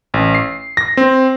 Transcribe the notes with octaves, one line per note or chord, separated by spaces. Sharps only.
A1
C7
A#6
C4